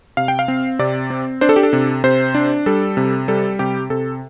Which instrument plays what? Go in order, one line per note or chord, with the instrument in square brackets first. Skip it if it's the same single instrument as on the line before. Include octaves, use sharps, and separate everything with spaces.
[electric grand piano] C3 F5
G5
F5
C4
C3 D5
C4
D4 C5
A4
G4
A4
C3
C3 C5
D4
G3 A4
C3
G3 A4
C3 G4
C3 A4